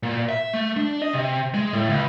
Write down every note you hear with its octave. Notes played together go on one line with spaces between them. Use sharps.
A#2
E5
A3
D4
D#5
C3
G#3
A2
C#2